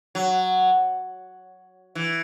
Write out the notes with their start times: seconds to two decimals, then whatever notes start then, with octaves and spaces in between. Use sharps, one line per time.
0.15 F#3
1.95 E3